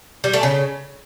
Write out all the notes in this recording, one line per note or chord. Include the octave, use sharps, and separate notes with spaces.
G3
A3
C#3